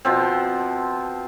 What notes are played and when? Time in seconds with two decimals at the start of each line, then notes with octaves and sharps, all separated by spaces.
0.05 B2 F3 C4